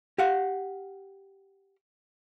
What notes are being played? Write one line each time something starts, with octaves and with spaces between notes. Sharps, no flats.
G4 F5 F#5